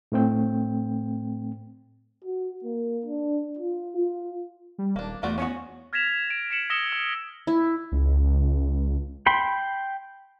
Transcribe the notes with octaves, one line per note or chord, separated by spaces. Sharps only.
A2 A3 C4 G5
F#4
A#3
D4
F4
F4
G3
D#1 A#3 D4
E2 A3 F4 F#4 D5
B3 C#4 F#4
F6 G#6 A#6 B6 E7 F7
D7
B6 C#7 E7 F#7
D#6 E6 A#6 C#7 E7 G7
E6
E4
C#2
G5 B5 C6